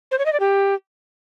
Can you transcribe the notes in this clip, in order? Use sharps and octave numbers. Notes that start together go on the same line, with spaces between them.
C5
C#5
D#5
D5
G4